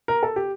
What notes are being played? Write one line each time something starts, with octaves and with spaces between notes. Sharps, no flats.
A#4
A4
G4